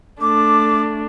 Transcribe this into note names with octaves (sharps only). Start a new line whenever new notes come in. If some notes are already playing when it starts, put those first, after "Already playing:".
A3 D4 D6